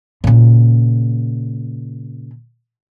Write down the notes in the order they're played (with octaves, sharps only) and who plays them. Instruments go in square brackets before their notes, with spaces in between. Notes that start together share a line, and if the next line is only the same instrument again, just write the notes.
[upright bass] A#2 C#3